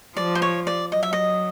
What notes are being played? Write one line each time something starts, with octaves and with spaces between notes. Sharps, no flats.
F3 D5
C5
C#5
D5
F#3 D#5
E5
D#5